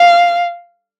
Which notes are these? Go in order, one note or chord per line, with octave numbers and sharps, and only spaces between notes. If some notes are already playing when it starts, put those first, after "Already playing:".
Already playing: F5